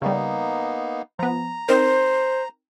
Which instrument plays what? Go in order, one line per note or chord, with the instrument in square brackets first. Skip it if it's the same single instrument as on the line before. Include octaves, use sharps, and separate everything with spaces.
[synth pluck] C#3 G3 [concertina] A#3 B3 D#4
[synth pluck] F3 B3 [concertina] A#5
[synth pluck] C4 D#4 A#4 [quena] C5